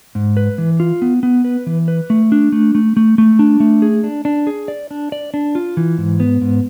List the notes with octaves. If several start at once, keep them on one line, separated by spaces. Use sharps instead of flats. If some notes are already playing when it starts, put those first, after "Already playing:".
G#2
B4
E3
F4
B3
B3
B4
E3
B4
A3
D4
A3
A3
A3
A3
D4
A3
G#4
D4
D4
G#4
D5
D4
D5
D4
F4
E3
G#2
B3
G#2